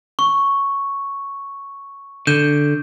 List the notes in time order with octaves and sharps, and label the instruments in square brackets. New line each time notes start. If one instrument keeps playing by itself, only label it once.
[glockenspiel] C#6
[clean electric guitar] D3 [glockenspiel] G6 E7